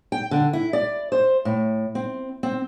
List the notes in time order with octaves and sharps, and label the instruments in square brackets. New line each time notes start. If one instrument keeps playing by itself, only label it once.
[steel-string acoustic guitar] G5
D3
E4
D5
C5
A2
C4
C4